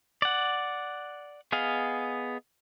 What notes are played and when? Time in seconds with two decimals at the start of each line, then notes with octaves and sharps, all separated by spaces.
0.22 D5 F#5
1.52 B3 G#4 D#5 F5